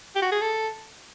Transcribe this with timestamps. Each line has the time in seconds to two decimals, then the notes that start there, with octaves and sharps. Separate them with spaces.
0.15 G4
0.22 F#4
0.32 G#4
0.41 A4